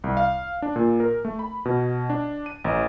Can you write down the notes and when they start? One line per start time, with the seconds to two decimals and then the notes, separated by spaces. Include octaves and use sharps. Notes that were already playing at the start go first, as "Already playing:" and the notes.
0.04 C2
0.17 F5
0.62 D4
0.76 A#2
1.00 A#4
1.25 A3
1.39 B5
1.65 B2
2.10 D4
2.46 D#7
2.64 A1